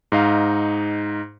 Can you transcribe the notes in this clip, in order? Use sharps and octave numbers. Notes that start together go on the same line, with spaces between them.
G#2 D#4 F5